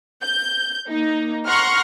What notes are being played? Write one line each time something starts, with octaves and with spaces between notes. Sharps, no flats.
G6
A#3 D#4
F#5 A#5 C6 C#6 F6 F#6